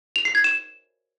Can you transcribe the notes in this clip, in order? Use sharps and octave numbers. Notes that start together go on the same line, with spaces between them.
F7
C7
G#6
E7